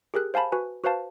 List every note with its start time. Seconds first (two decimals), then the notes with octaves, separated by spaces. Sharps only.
0.14 G4 G#4 A#4 F#6
0.34 C5 F5 G#5 A5 B5
0.52 F#4 B4 G#5
0.84 F#4 B4 C5 F5 A5